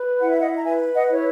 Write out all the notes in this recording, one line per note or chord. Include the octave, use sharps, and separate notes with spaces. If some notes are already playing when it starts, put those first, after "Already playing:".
Already playing: B4
E4 F#5
E5
D#5 F#5
A#5
B4 E5 G#5
D#5 F#5
E4 C#5